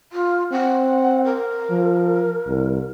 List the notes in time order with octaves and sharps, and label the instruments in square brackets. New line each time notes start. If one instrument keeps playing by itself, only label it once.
[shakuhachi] F4
[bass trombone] C4 [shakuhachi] F#5
[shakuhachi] A#4
[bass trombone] F3
C2